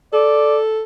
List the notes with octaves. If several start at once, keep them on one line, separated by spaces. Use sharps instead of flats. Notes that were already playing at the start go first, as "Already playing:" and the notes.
A4 D5